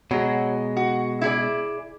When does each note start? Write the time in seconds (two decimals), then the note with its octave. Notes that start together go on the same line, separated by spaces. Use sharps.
0.11 B2 F#3 G#3
0.77 F#4
1.21 E4 G#4 D5